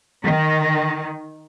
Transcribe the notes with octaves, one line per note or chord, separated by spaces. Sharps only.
D#3